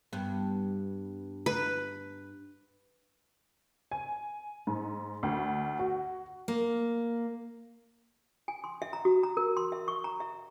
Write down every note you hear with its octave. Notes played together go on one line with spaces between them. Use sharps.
G2 B3
B4
G#5
G#2
D2
F#4
A#3
G#5
C6
E5
A#5
F#4
A#5
A#4
C6
E5
C#6
A#5
E5